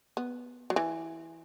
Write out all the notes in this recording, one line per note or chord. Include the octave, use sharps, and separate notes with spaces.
B3
F#3
E3